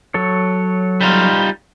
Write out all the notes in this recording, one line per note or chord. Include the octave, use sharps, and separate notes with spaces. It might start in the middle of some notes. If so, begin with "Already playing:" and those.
F#3 A4 C#5
G3 D#4 F4